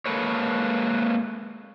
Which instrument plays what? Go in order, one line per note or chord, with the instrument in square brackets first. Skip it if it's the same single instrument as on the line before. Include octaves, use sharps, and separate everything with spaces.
[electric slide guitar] G#3 A#3 A4 B4 C#5